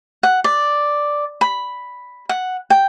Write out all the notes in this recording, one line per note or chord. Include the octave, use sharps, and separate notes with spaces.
F#5
D5
B5
F#5
G5